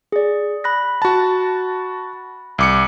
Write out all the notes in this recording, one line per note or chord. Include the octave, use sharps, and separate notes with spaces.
G#4 D5
B5 F#6 A#6
F#4 A5
C2 D6 C#7